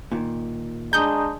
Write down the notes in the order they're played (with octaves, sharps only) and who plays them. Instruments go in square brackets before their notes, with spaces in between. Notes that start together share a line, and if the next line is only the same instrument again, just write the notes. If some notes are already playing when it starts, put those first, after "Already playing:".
[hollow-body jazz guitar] A#2 D#3
[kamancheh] G#3 D4 [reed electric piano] A#5 D#6 [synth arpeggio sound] G6